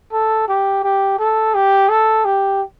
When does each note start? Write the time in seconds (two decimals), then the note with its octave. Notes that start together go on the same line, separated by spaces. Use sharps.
0.12 A4
0.48 G4
0.84 G4
1.19 A4
1.55 G4
1.89 A4
2.25 G4